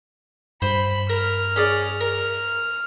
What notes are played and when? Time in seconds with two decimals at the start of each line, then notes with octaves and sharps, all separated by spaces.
0.62 G2 C5 B5
1.10 A#4 F6
1.56 C#4 G#4 D5
2.01 A#4